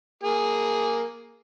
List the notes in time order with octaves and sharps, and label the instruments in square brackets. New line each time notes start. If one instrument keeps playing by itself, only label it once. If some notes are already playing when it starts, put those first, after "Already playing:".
[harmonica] A#3 G#4